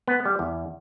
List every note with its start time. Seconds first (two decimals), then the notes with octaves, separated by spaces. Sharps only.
0.07 B3
0.25 G3
0.39 E2